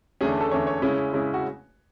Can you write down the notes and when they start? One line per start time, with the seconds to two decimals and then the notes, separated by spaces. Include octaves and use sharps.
0.21 E2 D3 A3 C#4 G#4
0.41 A4
0.51 E2 D3 A3 C#4 C#5
0.67 C#5
0.82 C#3 G#3 C#4 E4
1.13 C#3 G#3 C#4 E4
1.34 F#4